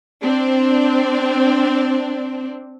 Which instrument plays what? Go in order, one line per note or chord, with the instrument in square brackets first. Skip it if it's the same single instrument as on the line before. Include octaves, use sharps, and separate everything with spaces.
[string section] C4 D4